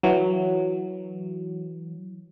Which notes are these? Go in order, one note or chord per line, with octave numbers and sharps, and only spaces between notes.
E3 F#3